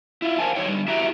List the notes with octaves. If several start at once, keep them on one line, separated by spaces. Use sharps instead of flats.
E4 F4
A#4 C5 F5 G#5 A5
F#3 D#4 C#5 G5
D3 G3
E4 F#4 G4 E5 G5 A#5